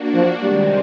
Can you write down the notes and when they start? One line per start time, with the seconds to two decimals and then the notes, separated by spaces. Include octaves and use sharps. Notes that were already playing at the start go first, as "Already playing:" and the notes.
Already playing: A#3 D4 F#4
0.14 F3
0.43 C3 D#3 G3 G#3 C4